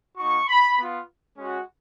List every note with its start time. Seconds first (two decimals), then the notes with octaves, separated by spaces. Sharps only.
0.17 A#3 D#4 F#4 C#6
0.48 B5
0.78 B3 F4
1.38 G#3 C#4 F#4